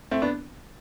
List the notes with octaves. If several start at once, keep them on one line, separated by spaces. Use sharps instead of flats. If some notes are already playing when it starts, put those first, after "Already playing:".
A3 C4
B3 D4